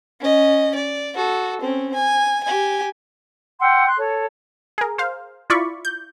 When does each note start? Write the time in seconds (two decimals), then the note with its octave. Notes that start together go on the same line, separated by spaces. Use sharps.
0.20 C#4 D#5
0.75 D5
1.15 F#4 A4
1.61 C4 C#4
1.94 G#5
2.44 G4 G#5
3.60 F#5 G5 C6 E6
3.86 C6 F#6
3.97 A4 C#5
4.78 G#4 A#4
4.98 C5 F5
5.50 E4 F4 D5 B5 C#6
5.85 G6